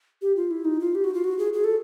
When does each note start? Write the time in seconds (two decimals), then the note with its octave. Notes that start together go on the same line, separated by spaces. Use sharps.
0.22 G4
0.36 F4
0.51 E4
0.65 D#4
0.80 F4
0.95 G4
1.04 F#4
1.14 F4
1.24 F#4
1.39 G#4
1.53 G#4
1.64 A4